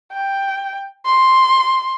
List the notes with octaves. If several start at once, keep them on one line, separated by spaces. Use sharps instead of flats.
G5
C6